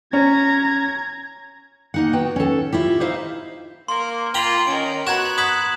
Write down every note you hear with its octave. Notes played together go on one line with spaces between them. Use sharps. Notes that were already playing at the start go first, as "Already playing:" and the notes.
C#4 C#5 A#5 G#6
A#3 D#4 F#5
B3 F#4 G5
C#4 A4
E4 F4 G4
D#4 C5 E5 F5
A#3 A#4 C6
F4 G5 A#5 B5
D#3 C#4 A#4 D7
B3 F#4 A#5 F#6 G#6 E7
B5 D#6 G#6 B6